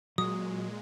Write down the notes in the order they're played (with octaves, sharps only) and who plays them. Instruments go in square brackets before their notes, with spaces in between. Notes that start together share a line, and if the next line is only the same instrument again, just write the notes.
[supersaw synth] A#2 G#3 [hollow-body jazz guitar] F#3 [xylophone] D#6